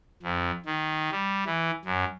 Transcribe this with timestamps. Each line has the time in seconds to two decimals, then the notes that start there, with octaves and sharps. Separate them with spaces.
0.23 F2
0.66 D#3
1.12 G3
1.46 E3
1.85 F#2